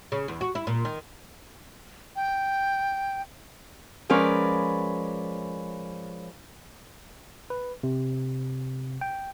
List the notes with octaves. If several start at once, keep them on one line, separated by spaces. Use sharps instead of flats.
C#3
E2
F#4
E4
A#2
D#3
G5
F3 G#3 C#4 A#4 B4 D5
B4
C3
G5